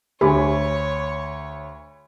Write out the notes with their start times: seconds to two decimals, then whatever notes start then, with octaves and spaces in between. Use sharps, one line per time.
0.21 D2 G4 C#5 G#5 B5